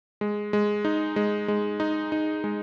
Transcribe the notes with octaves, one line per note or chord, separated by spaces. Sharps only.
G#3
G#3
D#4
G#3
G#3
D#4
D#4
G#3